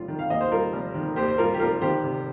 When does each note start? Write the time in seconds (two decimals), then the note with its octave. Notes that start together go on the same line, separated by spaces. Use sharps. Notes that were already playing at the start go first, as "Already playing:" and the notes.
Already playing: F1 G3 F4
0.08 D#3
0.19 F5
0.30 D#2 D#5
0.41 C5
0.51 G3 F4 A#4
0.73 F1
0.95 D#3
1.16 D#2 G4 C5
1.28 C5
1.38 G3 F4 A#4
1.54 G4
1.60 F1 F4 A#4
1.81 D#3 G4 C5
2.03 C3